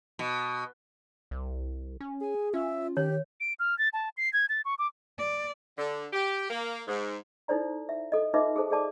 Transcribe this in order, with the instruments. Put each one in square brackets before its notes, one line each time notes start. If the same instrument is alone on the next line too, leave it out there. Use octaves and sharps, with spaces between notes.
[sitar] B2
[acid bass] C2
C#4
[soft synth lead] G#4 [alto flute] G#5
[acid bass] C#4 [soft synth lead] F4 [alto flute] E5
[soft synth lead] D#3 [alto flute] G4 [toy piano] C#5
[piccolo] D7
F6
A6
A5
C7
G#6
A6
C#6
D6
[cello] D5
[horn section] D3
G4
A#3
G#2
[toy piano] D#4 E4 A4 C5 D5 A#5
E5
A4 D#5
D#4 F4 B4 D#5 E5 D6
G#4 A4 C5 A5
G#4 A4 D5 A5 D6